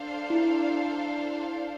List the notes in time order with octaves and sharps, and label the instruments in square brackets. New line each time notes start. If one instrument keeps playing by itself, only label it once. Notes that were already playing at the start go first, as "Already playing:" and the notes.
Already playing: [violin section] D4 A4 C5 F5
[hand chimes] E4